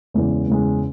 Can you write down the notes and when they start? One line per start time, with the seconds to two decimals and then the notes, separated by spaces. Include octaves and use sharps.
0.14 E2 C#3 G#3
0.47 E2 C#3 G#3